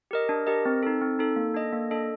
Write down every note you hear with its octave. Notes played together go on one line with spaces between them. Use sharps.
G4 A#4 D#5
D4
G4 A#4 D#5
C4
D#4 A4
C4
D#4 A4
A#3
D4 A4 D#5
A#3
D4 A4 D#5